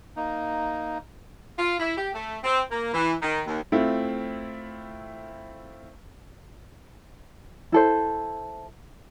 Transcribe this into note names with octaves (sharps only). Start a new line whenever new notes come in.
A#3 D#4
F4
E4
G4
A3
C4
A#3
E3
D#3
D#2
A3 C4 E4 F4
E4 A4 C5